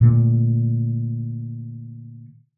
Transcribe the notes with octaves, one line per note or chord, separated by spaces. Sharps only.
A#2 D3 A3